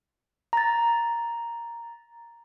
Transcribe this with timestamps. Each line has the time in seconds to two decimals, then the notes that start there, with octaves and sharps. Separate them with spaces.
0.53 A#5 A6